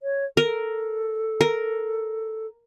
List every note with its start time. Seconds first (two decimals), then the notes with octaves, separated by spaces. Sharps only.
0.03 C#5
0.37 A4 A#4
1.41 A#4